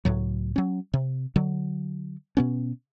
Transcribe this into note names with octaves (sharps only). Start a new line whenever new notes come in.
C#2 A2 F#3
F#3 C#4
C3
D3 F#3
B2 B3 C#4